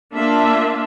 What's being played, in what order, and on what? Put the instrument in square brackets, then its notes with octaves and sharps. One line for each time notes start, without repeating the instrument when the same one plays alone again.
[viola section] A#3 D4 F4 A#4 E5